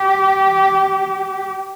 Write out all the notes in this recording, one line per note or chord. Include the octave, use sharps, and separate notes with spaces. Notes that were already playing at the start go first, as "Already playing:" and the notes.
Already playing: G4